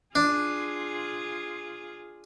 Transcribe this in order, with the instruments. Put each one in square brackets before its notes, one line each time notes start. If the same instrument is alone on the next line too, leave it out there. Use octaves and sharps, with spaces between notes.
[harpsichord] D4 [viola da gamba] F4 G#4